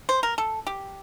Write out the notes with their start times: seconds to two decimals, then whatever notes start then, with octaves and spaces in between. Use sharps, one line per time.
0.09 C5
0.23 A#4
0.38 A4
0.67 G4